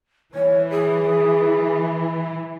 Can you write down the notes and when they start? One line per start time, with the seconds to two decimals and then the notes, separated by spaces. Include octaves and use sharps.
0.34 E3 C#5
0.71 G#4